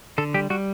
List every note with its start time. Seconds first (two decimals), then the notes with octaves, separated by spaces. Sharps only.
0.18 D3 A4
0.34 G3 G4
0.50 G3 F#4